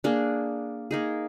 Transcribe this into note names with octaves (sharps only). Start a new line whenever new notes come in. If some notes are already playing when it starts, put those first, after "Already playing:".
A#3 D4 G#4
A#3 D#4 G#4